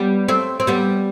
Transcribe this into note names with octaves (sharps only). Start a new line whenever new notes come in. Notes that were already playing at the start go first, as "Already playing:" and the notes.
Already playing: G3 B3
A3 C4
C4
G3 B3